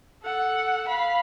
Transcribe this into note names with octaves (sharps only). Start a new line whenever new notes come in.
A4 F#5
F5 B5